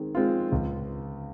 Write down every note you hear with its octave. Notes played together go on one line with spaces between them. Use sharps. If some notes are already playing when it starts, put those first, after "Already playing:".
Already playing: D#3 G#3 C4
G#3 C4 F4
C#2